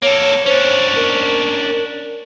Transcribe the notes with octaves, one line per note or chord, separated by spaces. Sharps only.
A#3 A4 C#5
C#4 D4 C5
A#4